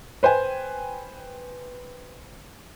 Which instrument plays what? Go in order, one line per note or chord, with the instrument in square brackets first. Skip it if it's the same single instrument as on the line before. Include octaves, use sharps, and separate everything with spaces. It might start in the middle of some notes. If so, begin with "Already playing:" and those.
[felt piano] B4 C5 G5 G#5